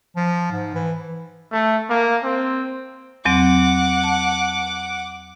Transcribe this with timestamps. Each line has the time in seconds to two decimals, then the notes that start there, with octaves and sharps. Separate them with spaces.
0.16 F3
0.51 G#2
0.74 E3
1.52 A3
1.89 A#3
2.24 C4
3.25 E2 F#3 C4 F#5 D6
4.04 A5